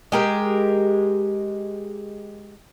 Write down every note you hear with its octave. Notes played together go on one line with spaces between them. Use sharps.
G#3 G4 A#4